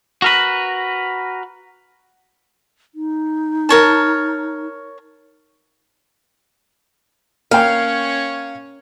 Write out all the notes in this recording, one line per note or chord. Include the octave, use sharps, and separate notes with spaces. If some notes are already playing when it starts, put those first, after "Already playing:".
F#4 A#4 B4
D#4
A#4 C#5 A5
A#3 C#4 C#5 F5 G5